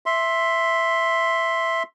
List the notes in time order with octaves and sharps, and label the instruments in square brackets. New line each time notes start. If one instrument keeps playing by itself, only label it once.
[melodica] E5 C6